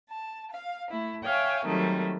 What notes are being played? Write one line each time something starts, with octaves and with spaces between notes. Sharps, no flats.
A5
F5
A3 E4
C#5 E5 F5 G5 G#5
D#3 F#3 G3 A3 C4